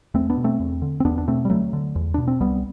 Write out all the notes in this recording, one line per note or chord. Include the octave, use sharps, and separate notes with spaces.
E2 A3 C4
B3 D4
B2
A3 C4
E2
D3
C4
E2 B3 D4
D4
B2 A3 C4
G3
D2 F#3 A3
D3
E2
B2 D4
C4
C2 G3 B3